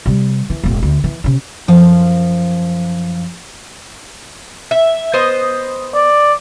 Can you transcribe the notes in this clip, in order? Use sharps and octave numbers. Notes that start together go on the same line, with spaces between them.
C3 G3
E3
E1 A1
D2
E3
C3 C#4
F#2 F3 F5
E5
B3 C5 D#5
D5